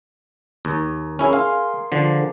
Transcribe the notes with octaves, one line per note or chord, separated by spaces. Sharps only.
D#2
C#4 E4 G#4 A#4
F5 C6
D3 F3 D6